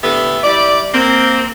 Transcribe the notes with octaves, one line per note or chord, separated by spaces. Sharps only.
A2 D3 B3 G4 E5
G3 E4 D5
A#3 C4